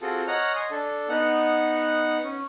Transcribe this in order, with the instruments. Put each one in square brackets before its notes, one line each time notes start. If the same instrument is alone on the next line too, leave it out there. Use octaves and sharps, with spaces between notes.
[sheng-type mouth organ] C4 F4 F#4 G#4 A4
C#5 D#5 F#5 A#5 F6
D#5 G#5 C6
D4 A4
B3 D#4 F#5
C#4